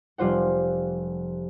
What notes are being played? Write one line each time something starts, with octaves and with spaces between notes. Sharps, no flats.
F1 G3 F4 C5 F#5